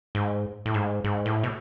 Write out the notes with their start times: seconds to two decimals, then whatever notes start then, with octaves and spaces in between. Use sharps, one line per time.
0.15 G#2
0.66 A2
0.74 G#2
1.04 G#2
1.26 A2
1.43 B2